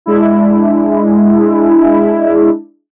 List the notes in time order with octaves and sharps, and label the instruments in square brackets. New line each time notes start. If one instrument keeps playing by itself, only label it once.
[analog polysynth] G#3 D4 E4